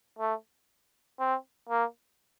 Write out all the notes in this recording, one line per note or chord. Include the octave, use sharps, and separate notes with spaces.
A3
C4
A#3